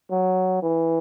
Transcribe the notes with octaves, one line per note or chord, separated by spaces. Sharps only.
F#3
E3